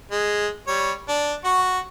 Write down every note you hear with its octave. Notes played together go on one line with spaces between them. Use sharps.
G#3
G3 C#5
D4
F#4 C#6